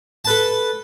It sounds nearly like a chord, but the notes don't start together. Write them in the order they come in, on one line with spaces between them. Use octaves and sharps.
A5 B4 A4